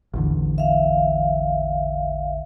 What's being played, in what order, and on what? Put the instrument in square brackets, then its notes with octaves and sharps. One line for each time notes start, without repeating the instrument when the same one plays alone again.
[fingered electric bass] A1 E2 D3
[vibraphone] E5 F5